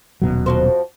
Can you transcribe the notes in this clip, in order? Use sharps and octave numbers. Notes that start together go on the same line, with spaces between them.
D#1 B2 F#3
F2 F#4 C5